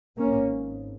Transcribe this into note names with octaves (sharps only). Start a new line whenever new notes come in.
G#1 G#2 A#3 C#4